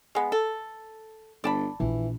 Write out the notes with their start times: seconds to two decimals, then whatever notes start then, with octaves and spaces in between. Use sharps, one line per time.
0.15 G#3 B3
0.32 A4
1.44 G1 D5 A5 B5
1.80 A#1 E3